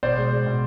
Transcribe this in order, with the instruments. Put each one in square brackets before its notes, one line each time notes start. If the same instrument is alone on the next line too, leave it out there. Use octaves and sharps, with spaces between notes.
[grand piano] B2 C5 D5
G#3
G#3
B2